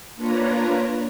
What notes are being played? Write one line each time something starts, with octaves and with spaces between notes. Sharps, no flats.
A#3 D4 F4 B4 C#5 A#5